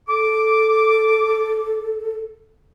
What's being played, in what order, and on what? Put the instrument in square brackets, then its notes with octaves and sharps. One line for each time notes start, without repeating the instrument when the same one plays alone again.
[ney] A4 [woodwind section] D6